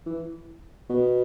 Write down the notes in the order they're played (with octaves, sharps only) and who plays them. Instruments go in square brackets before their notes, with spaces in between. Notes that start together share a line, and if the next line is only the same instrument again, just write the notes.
[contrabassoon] E3
B2